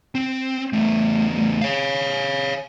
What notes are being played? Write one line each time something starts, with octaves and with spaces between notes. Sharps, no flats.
C4
E2 A3
C#5 F5